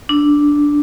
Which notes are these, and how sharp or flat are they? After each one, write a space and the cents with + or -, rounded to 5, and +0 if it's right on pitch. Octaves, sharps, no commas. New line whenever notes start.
D4 -5